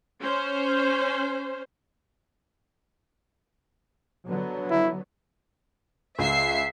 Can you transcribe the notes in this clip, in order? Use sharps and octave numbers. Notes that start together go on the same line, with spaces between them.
C#4 C5
D3 F#3 B3
E4
C#2 E5 C7